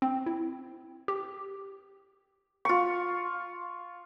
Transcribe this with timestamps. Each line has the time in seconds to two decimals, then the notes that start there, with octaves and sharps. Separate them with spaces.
0.02 C4
0.26 E4
1.08 G4
2.65 F4 C#6